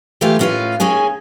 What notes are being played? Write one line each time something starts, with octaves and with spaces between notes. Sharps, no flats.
E3 F3 A3 F4 G4 F5
A2 C#4 F4 F#4 B4 F5
D#2 A#3 C#4 G#4 G#5